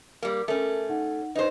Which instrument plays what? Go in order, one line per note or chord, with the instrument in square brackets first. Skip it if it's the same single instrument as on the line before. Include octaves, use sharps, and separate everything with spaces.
[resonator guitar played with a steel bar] G3 A#3 [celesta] A#4
[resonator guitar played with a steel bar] A3 C#4 [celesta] A#4
[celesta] D#4 F#5
[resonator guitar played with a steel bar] D#4 C5 [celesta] B4 D#5